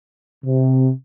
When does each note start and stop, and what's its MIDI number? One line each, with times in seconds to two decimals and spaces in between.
0.45 0.90 48